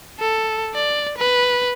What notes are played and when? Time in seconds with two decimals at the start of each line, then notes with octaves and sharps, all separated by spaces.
0.20 A4
0.74 D5
1.18 B4